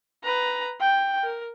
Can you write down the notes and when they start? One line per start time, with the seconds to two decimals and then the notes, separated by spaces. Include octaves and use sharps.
0.24 B4 A#5
0.80 G5
1.23 A#4